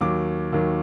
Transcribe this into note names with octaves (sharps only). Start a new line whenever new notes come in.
D#2 D#3 F#3 D6
D#2 D#3 F#3